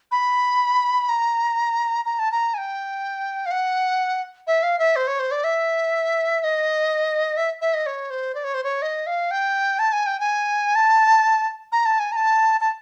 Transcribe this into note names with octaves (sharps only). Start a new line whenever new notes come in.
B5
A#5
A#5
A5
A#5
G#5
G5
F5
F#5
E5
F5
E5
C5
C#5
C5
D5
E5
E5
D#5
E5
E5
D#5
C#5
C5
D5
C#5
C5
C#5
D#5
F5
G5
A5
G#5
G5
G#5
A5
A#5
A5
G#5
A#5
A5
A5